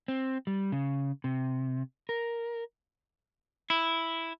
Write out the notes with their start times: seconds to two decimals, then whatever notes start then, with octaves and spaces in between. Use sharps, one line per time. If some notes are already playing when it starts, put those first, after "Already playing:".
0.08 C4
0.47 G3
0.72 C#3
1.24 C3
2.09 A#4
3.70 E4